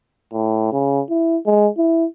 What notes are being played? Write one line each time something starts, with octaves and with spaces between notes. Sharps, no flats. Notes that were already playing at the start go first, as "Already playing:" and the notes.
A2
C#3
E4
G#3
E4